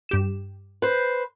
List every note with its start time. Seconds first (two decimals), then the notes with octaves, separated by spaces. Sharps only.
0.09 G2 G4 E7
0.82 B4 C5